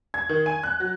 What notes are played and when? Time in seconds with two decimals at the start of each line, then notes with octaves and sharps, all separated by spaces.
0.14 G#6
0.29 D#3
0.46 G#5
0.63 F#6
0.80 F#3